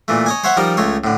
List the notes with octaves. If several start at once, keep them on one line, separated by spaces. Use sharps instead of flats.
A#2 E3 A3
C#5 D#5 G#5
C5 C#5 E5 F#5 C6
F3 G3 D#4 A#4
C#2 A3 C#5 C6
A2 D3